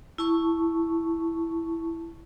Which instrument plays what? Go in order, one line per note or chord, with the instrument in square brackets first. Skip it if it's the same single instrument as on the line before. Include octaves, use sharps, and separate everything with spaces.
[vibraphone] E4 A5 C#6